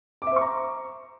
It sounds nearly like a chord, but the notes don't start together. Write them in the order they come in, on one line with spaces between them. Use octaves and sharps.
D6 E5 C5 C#6 A#5